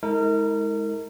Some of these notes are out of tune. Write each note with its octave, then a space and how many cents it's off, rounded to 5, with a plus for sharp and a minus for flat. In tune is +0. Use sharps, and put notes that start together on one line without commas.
G#3 +15 D#4 +45 A#4 -30